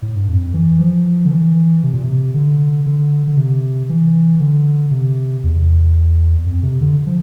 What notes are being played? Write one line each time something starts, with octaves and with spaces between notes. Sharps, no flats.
A2
G2
F2
E3
F3
D3
E3
C3
A#2
C3
D3
D3
D3
C3
E3
D3
C3
E2
F2
C3
D3
F3